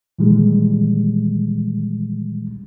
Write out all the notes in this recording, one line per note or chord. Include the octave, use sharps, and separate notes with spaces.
A#2 D#3 E3 G3 G#3